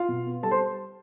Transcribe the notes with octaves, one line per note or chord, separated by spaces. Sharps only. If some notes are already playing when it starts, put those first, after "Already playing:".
Already playing: F4 F5
B2
B3
G3 A4 A5
C5 C6